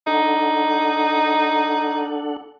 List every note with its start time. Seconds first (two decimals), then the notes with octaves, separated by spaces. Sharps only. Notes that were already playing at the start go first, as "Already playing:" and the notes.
0.07 D4 D#4 A4 F#5